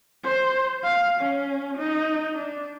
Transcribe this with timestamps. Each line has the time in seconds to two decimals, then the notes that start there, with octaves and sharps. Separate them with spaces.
0.24 C5
0.83 F5
1.21 C#4
1.78 D#4
2.35 D4